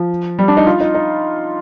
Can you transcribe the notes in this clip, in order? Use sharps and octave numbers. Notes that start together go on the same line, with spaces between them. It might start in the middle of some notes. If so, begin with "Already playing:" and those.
Already playing: F3
G3
D4
D#4
F4
D#4
D#4